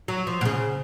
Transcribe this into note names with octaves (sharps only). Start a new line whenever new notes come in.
F#3
F3
B2
C#3